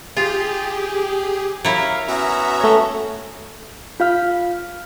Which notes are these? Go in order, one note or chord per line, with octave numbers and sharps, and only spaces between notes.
F4 G4 G#4
F#3 E4 A#4 F5
B3 C#4 F#4 E5 A#5
A3 C#5
F4 F5 F6